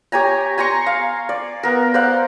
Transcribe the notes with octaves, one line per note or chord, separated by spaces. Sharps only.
G4 C#5 G#5 A#5
G#5 A#5 C6 C#6
F5
D5
B3 A#4
C5 D5 F5 F#5